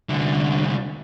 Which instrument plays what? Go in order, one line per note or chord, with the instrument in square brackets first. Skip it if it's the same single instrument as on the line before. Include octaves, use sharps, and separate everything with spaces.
[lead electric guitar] C2 D3